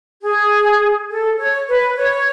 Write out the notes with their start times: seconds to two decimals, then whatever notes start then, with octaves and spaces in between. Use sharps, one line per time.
0.22 G#4
1.09 A4
1.37 C#5
1.68 B4
1.96 C#5